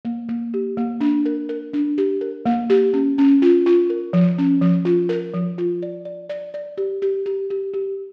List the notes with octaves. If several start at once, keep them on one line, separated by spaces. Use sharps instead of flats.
A#3
A#3
G4
A#3
D4
A#4
A#4
D4
G4
A#4
A#3
G4
C#4
C#4
F4
F4
A#4
F3
C#4
F3
F4
A#4
F3
F4
D5
D5
D5
D5
G4
G4
G4
G4
G4